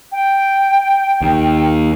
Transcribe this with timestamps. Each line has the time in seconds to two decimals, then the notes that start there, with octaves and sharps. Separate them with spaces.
0.12 G5
1.22 D#2